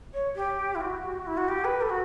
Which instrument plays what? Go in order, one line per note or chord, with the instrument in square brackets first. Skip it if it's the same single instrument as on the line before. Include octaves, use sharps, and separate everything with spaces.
[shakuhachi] C#5
G4
E4
F#4
E4
F#4
G4
B4
A4
F#4